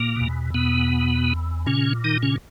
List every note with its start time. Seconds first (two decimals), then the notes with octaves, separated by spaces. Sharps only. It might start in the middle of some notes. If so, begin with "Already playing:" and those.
Already playing: A#2 A#3
0.16 E2 B2
0.54 B2 B3
1.66 A#2 C#3 C#4
2.04 D#3 D#4
2.23 C#3 C#4